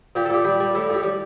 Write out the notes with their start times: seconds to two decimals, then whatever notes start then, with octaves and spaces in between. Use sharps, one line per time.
0.15 A#2 G4
0.26 A4
0.30 A#2 G4
0.45 G3 G4
0.60 G3
0.75 A2 A4
0.90 A2 G4
1.03 G3